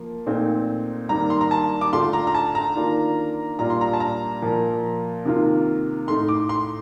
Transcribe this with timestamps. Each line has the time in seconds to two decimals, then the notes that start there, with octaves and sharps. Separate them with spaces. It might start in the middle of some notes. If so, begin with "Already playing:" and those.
Already playing: F3 A#3
0.27 A#2 A3 C4 D#4
1.09 G2 D#3 A#3 D4 A#5
1.30 C6
1.41 A#5
1.51 A5
1.81 D6
1.92 D3 A3 D4 F4 C6
2.13 A#5
2.27 A#5
2.35 A5
2.55 A#5
2.75 D#3 A#3 D4 F4
3.59 A#2 G3 D4 F4 A#5
3.70 C6
3.81 A#5
3.93 A5
4.00 A#5
4.42 A#2 F3 A#3
5.25 C3 D#3 A#3 F4
6.07 A2 A3 D#4 C6
6.29 D6
6.49 C6